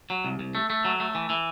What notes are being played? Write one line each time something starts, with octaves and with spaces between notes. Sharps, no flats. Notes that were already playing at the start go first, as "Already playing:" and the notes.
F#3
C2
C2
A3
A3
F#3
A3
E3
E3